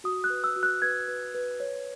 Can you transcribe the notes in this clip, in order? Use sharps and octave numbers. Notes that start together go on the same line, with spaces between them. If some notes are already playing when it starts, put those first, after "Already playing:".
F#4 D#6
F#6
B4
E6
F#4
F#6
B4 G#6
B4
B4
C#5